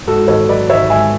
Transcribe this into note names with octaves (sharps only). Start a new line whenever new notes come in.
G#2 F#4 A4
G#1 A4 C#5
F#3 B4 D5
G#1 C#5 E5
G#2 E5 G#5